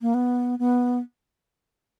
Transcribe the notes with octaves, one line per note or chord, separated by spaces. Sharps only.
A#3
B3
B3